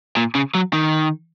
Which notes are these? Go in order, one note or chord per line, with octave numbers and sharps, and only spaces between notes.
A#2
C#3
F#3
D#3